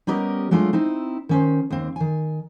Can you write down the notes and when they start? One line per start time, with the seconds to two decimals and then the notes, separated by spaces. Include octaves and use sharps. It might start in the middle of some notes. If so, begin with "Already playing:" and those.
0.07 G3 B3 C#4 G4 A#4 D#5
0.51 F#3 G#3 A3 D4 F4
0.73 C4 D#4 E4
1.29 D#3 C#4 C5
1.70 D#2 C4
1.96 D#3 G#5